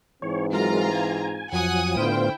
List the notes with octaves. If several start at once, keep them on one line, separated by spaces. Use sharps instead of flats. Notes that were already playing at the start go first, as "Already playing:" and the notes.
G#2 E3 C4 C#5
F#3 G#3 F4 A#4 A#5
G#5
F2 F3 F#3 F#5 G#5 D#6
A2 D3 B3 E4 F4 C5 G5